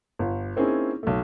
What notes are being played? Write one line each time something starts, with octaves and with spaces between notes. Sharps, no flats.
G1
A#3 C4 C#4 D#4 E4 G#4
B1 A3